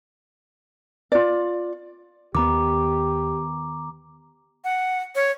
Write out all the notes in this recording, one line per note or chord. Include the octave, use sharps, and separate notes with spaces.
F4 D5
D#2 D#3 B3 G4 A#5 D6
F#5
C#5